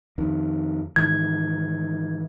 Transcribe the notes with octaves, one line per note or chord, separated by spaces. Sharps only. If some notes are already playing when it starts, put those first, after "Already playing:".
F2 D#3
G#2 D#3 E3 G#6